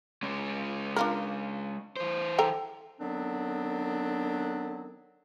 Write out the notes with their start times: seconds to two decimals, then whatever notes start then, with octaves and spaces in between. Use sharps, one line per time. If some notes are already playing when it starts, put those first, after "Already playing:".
0.23 G#3 C#4
0.96 D4 F4 A#4
1.96 E3 C5
2.38 A4 G5 A#5
3.00 D3 D#3 F#3 B3 C4 D4